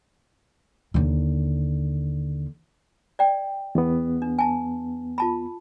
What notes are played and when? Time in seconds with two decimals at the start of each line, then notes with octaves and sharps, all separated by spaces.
0.94 D#2 D3
3.19 D5 G5
3.75 E2 B3
4.22 D4
4.39 G#5 A5
5.18 F4 A5 B5